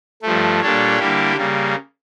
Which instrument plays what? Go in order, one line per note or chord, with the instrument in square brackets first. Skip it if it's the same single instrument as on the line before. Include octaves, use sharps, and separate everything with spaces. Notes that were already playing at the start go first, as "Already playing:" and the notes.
[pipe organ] G2 F3 A3
A#2 G3 D4 A4 C#5
D3 G3 A#3 E4 G4
C#3 G3 A#3